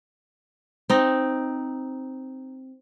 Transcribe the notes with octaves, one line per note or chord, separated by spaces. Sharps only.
C4 D#4